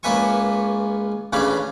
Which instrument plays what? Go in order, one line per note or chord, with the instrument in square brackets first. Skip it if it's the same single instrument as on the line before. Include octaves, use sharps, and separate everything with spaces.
[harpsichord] C#2 A#3 B4 E5 G#5 C#6
A1 C#3 E3 C#4 D4 B5